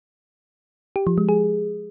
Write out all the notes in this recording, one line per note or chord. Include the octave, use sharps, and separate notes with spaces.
G4
F3
G#3
G#4